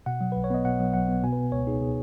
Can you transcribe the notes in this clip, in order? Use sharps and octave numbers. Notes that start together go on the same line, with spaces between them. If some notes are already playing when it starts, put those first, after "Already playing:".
B2 F#5
F#3
B1 B4
C#5
B3 D#5
B2 F#5
F#3
B1 F#5
B3
B2 G#5
B4
B3
C#2 C#5
D#4 G#4
B2 G#4